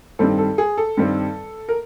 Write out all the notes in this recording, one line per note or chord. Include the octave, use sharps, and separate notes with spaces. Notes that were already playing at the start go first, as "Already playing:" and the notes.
G2 D#3 G3 C4 A4
A4
G#4
A4
G2 D#3 G3 C4
A#4